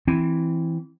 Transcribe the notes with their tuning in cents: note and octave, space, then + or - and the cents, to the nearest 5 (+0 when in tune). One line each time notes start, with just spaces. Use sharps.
E3 +0 C4 +0